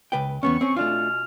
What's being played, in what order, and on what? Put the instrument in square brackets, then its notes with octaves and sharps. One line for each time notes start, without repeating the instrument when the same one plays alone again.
[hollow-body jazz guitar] C#2 B4 G5
[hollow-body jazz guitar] E2 B3 C#4 [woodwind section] C#6
[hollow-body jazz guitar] C4 C#4
[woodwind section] B2 G#5 F6 [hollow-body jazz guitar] A3 D4 F4